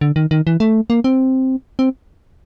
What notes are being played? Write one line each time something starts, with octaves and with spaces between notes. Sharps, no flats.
D3
D#3
D#3
E3
A3
A#3
C4
C4